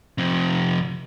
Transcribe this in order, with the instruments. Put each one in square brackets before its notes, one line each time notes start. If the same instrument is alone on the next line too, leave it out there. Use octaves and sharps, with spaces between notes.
[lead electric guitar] F2 C3